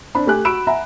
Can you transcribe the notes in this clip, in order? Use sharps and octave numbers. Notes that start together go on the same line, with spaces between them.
C4 D4 B5
A3 G4 G#5 F#6
F#4 B5 E6 D7 E7
E5 F#5 G#5 A#5 B5